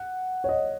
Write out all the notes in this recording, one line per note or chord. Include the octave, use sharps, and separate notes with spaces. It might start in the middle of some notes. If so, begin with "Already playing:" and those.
Already playing: F#5
C#5
D#5